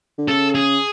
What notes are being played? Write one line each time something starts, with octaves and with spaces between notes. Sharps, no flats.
D3
C#3 A4
G#4